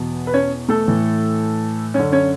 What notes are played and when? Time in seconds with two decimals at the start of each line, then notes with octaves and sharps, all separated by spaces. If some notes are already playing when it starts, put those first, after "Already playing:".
Already playing: E2 B2 B3
0.27 B4
0.34 C#4 C#5
0.69 A3 A4
0.88 A2 E3
1.94 F#2 D3 C#4 C#5
2.12 C#4 C#5